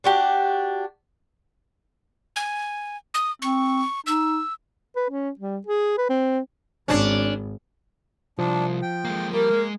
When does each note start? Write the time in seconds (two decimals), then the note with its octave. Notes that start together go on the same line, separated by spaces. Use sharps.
0.04 D4 F#4 G4
2.36 G#5
3.14 D#6
3.42 C4 C#6
4.07 D#4 E6
4.96 B4
5.10 C#4
5.40 G3
5.67 G#4
5.98 B4
6.09 C4
6.88 G#1 C#4 D4
8.39 C2 F3 D4
8.82 G5
9.05 G#3 A#3
9.33 G3 A#3 A#4
9.51 G#3